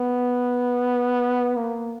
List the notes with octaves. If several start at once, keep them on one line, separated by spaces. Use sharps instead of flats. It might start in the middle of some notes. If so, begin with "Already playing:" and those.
Already playing: B3
A#3